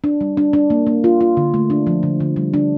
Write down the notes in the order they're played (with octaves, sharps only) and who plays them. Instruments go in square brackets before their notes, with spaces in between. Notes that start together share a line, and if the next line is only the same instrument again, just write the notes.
[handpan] D4
G3
D4
D4
A#3
A#3
F4
F4
D3
A3
D4
F3
D3
D3
G3
D4